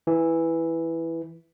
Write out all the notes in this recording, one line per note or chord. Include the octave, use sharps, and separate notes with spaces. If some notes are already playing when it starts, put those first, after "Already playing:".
E3